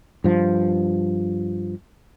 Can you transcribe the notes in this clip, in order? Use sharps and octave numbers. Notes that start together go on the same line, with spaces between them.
G2 F3